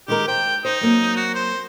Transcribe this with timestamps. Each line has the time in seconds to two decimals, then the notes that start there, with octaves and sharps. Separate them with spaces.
0.08 D#3 G#3 G4 A#4
0.28 C5 G5
0.65 D#4 C5
0.81 F#3 A#3 C4
1.16 F#4
1.35 C5